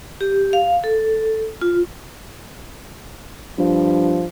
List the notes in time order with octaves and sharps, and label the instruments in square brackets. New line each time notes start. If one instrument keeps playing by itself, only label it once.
[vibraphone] G4
F5
A4
F4
[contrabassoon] G2 [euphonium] F3